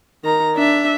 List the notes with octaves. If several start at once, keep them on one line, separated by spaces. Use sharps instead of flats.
D#3 A#5
D4 E5